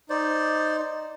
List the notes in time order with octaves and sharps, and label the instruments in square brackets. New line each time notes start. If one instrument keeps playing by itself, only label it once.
[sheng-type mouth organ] D#4 [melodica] C5 D5